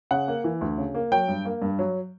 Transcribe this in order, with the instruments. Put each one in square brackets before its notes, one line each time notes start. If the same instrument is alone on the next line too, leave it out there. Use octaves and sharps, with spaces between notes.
[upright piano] C#3 F#5
A#3
E3
D2
C#3
A#3
F#3 G5
G2
A#3
G2
F#3